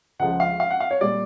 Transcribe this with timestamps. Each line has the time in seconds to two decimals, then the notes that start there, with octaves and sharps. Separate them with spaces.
0.19 C#2 C#3 F3 G#3 F#5
0.40 F5
0.60 F5
0.71 F#5
0.80 F5
0.91 C#5
1.01 A#2 G3 D5